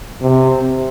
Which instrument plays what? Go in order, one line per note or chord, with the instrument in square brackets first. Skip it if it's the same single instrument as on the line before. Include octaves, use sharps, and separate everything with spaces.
[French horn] C3